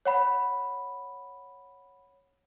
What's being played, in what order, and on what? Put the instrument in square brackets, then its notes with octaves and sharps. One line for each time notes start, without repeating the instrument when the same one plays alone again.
[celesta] C#5 F#5 B5